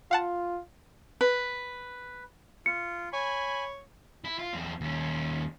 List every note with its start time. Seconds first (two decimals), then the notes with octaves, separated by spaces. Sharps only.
0.11 F4 F5 F#5 A5
1.21 B4
2.66 F4 C#7
3.13 C#5 G#5 B5
4.25 E4
4.39 F4
4.53 E2 C4
4.81 D#2 C#4